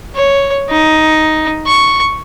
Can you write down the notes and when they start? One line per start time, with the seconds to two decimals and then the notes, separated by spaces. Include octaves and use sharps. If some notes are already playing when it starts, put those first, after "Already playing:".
0.15 C#5
0.70 D#4
1.67 C#6